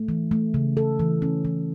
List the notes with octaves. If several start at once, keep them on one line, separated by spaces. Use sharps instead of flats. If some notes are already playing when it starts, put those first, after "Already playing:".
Already playing: A3
E3
A3
C#3
A4
E3
C#4
E3